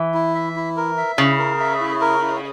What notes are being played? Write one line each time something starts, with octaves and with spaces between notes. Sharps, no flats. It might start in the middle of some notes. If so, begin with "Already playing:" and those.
Already playing: E3
E4
E5
E4
A#4
E5
C#3 E4
A#4
E5
E4
A#4
E4